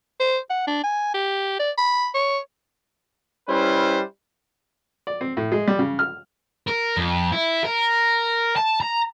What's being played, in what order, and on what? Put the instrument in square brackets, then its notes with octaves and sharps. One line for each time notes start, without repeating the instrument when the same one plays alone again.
[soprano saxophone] C5
F#5
D4
G#5
G4
D5
B5
C#5
[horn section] G3 C#4 E4 B4 C5
[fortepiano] D5
C4
A2
G#3
G3
C#3
F6
[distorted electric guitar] A#4
F2
E4
A#4
A5
A#5